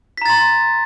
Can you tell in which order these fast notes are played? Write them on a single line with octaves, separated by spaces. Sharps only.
B6 A#5 A6 C6